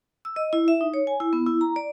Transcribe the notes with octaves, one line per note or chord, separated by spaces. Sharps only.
E6
D#5
E4
E5
D#4
C#5
G#5
E4
B3
E4
A#5
D5